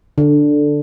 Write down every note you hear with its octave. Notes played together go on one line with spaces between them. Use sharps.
D3